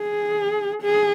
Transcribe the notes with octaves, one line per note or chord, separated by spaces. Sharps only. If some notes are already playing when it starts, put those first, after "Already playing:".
Already playing: G#4
G#4